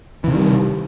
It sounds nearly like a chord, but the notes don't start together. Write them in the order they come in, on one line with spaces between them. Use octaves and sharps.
E3 C3 D#3 G3